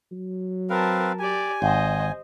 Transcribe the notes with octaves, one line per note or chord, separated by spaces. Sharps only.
F#3
C4 A#4 B4 F5 A5
G4 D5 G#5
G#1 C5 D#5